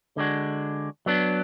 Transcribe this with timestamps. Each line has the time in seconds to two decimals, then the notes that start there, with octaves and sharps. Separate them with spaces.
0.17 D3 G#3 D4 F#4
1.06 F#3 B3 D4